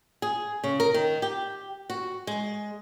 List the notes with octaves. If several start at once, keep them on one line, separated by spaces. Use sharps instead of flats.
G#4
C#3
A#4
D#3
G4
F#4
G#3